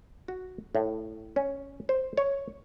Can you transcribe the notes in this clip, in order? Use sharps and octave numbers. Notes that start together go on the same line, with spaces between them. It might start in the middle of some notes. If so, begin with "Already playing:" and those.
F#4
A2
C#4
C5
C#5